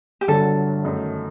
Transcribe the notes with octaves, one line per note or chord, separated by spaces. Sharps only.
G4
G1 G2 D3 F#3 A4
F#2 D#3 A3 D#4